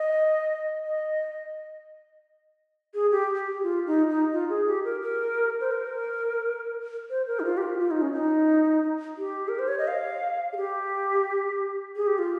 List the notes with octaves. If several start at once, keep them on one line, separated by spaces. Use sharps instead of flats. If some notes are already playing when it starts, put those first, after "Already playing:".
Already playing: D#5
D#5
G#4
G4
G4
F4
D#4
D#4
F4
G#4
G4
A#4
A#4
C5
A#4
C5
A#4
D#4
F4
G4
F4
F4
D#4
C#4
D#4
G4
A#4
C5
C#5
D#5
F5
G#4
G4
G#4
G4
F4